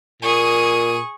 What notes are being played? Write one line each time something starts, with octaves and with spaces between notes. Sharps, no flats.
A#2 G#4 C#6 D#6